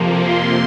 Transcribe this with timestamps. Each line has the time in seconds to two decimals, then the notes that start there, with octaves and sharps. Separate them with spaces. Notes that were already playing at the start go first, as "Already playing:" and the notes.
Already playing: F2 C3 F3 A#3
0.26 C6